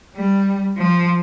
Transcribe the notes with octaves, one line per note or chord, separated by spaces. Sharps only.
G3
F3